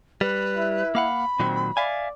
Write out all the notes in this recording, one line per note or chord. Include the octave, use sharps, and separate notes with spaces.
G3 B4
E4
A#3 F5 F#5 B5
A#2 D#3 F#3 C4
D5 E5 F5 G#5